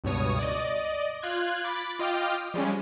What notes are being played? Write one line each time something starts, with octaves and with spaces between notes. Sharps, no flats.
C#2 G2 B2 C#5 D#6
D5 D#5
F4 F#6 G#6
B5 D6 A6
F4 D#5 G5 D6 F6
F3 G3 G#3 C#4